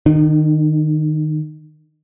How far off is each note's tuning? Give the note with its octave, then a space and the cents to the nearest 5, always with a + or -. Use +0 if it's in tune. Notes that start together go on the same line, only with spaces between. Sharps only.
D#3 -15 D4 +45